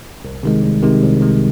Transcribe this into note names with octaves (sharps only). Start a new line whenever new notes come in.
C2
C3 D#3 G#3
C2
C3 D#3 G#3
C2
C3 D#3 G#3